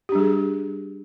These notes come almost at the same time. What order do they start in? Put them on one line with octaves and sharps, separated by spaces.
G4 D4 G3 G#4